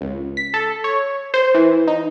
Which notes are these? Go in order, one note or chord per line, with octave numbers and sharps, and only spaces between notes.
C#2
B6
A4
C#5
C5
E3
D#4